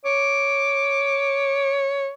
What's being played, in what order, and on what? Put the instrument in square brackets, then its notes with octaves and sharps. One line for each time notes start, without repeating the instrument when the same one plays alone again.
[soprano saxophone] C#5 [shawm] D6